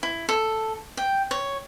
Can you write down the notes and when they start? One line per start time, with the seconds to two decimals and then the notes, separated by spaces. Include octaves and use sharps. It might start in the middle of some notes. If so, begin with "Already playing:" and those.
0.03 E4
0.29 A4
0.97 G5
1.31 C#5